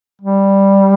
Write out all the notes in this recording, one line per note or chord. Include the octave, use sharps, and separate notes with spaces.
G3